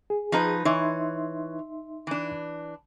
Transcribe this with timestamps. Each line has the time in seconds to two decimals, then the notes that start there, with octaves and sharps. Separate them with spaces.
0.10 G#4
0.32 F3 D#4 B4
0.65 E3 D#4 C#5 E5 C6
2.07 E3 D4